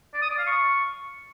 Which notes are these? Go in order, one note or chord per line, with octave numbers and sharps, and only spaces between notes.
D5
D#6
D5
F5
C#6